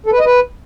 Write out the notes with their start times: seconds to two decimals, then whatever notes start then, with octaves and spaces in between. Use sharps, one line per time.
0.06 A4
0.13 B4
0.19 D#5
0.26 B4